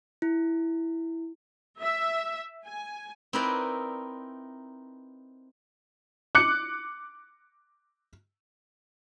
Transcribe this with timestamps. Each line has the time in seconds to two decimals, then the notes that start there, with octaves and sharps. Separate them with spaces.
0.22 E4
1.81 E5
2.67 G#5
3.33 C4 D#4 E4 A#4 B4 D5
6.35 D6 F#6 C#7